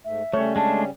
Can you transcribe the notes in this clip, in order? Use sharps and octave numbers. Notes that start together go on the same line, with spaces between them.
G#2 A3 E5
C#3 G3 A3 C#4 C#5
G#3 A3 D4 A5